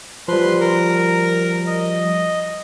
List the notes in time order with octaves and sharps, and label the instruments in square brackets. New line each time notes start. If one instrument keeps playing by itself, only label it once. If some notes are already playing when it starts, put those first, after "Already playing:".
[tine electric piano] F3 G3 [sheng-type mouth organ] B4 C6
[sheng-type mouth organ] A#4
D#5